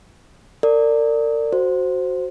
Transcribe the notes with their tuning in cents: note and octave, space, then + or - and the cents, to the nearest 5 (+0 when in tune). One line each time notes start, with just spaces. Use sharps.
A#4 -40 D5 +0
F#4 +0 C5 +0